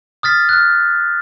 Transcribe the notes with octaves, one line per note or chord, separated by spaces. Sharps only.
D#6 F6 A6 B6
F6 F#6